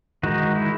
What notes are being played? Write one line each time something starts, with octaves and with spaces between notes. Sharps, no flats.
D#3 G#3 D#4 F#4
E4